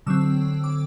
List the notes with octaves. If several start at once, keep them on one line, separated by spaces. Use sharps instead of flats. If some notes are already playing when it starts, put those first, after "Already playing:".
D3 F#3 C4 E6
D6